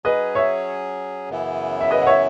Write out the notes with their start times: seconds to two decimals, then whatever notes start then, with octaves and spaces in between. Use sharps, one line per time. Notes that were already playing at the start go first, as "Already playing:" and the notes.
0.05 F#3 C#4 G#4 B4 D#5
0.35 C#5 E5
1.29 F#2 C#3 E3 B3 E4
1.81 E5
1.91 B4 D#5
2.02 F#5
2.07 C#5 E5